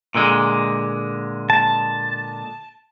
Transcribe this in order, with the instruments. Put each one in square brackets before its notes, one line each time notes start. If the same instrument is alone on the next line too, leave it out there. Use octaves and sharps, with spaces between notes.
[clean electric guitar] A#2 D3 G#3
[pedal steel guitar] A5